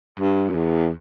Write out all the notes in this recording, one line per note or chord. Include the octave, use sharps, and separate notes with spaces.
G2
F#2
E2